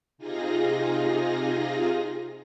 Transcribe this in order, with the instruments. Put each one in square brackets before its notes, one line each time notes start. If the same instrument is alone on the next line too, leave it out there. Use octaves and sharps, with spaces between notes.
[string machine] C3 D#4 F4 G#4 A#6